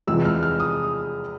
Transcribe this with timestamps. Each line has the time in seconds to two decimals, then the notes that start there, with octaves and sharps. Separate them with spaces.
0.07 E2 C3 F3 G#3 E6
0.25 F6
0.43 F6
0.60 D#6